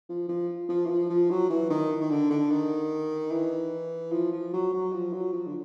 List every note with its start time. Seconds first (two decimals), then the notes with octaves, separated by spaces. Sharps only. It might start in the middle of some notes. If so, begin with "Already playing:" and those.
0.09 F3
0.29 F3
0.69 F3
0.86 E3
0.90 F3
1.10 F3
1.31 F#3
1.50 E3
1.70 D#3
2.01 D#3
2.11 D3
2.30 D3
2.51 D#3
3.32 E3
4.12 F3
4.32 F3
4.54 F#3
4.73 F#3
4.93 F3
5.13 F#3
5.33 F3
5.47 D3